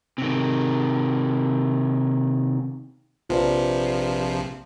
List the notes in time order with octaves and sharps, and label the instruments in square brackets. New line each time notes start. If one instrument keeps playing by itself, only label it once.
[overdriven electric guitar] C3 D#3
[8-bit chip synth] A#1 C3 F3 [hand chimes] F4 B4 D5